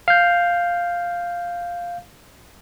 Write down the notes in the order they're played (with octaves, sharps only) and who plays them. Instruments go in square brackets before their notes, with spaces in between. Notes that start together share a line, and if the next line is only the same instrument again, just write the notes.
[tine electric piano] F5 G6